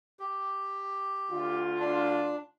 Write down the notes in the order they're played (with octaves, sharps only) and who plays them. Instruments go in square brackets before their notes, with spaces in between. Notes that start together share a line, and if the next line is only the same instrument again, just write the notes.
[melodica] G4
[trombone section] D2 F4
[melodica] D4